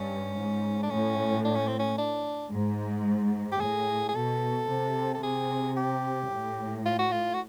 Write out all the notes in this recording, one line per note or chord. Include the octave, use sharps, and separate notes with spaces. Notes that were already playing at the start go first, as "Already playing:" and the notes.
Already playing: G2 C#4
G#2
D4
A2 C#4
D4
C#4
C4
C#4
D4
G#2
G4
A2 G#4
G#4
B2 A4
C3
A4
C3 G#4
G4
A2
F4
F#4
F4
F#4